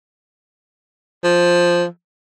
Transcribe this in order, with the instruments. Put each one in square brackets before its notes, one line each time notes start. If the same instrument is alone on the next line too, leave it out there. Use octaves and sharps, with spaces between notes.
[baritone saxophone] F3